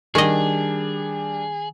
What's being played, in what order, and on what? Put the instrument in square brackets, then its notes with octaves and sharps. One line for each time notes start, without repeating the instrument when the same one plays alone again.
[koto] D#3 D#5 [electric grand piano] G3 D4 [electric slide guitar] G#4